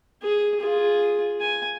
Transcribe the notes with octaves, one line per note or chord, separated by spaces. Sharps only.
G#4
F4 G#4
G#5